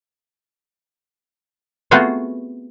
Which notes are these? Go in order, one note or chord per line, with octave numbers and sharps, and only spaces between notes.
A3 B3 C4 F4 F#4 G#4